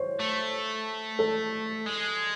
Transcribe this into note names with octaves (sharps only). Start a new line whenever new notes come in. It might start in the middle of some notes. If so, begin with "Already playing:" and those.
Already playing: C5 C#5
A3
A4
G#3